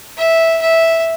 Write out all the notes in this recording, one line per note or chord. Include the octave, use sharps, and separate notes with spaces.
E5
E5